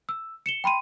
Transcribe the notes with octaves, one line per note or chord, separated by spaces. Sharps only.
E6
C#7 E7 G7
G5 B5 C6 D#7